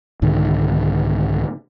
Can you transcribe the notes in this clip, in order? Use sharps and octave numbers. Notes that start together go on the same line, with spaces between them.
C2 G#2 D3 D#3